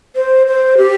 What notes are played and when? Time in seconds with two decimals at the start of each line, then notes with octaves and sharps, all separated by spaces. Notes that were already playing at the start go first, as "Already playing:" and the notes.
0.16 C5
0.47 C5
0.77 G4